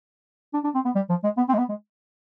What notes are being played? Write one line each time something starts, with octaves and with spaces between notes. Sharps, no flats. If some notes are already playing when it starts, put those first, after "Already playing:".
D4
D4
C4
B3
G3
F3
G#3
B3
C4
G#3
B3
G#3